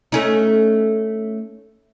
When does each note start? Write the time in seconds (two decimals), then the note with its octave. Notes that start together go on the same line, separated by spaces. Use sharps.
0.12 A3 C#4 D#4